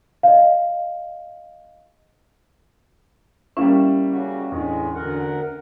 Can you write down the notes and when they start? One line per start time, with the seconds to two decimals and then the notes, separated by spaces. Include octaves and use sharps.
0.23 D#5 F5
3.57 G3 A#3 C#4 E4
4.12 C#3 F#4
4.52 E2 A2 G#3 D4
4.95 D2 A#4 F#5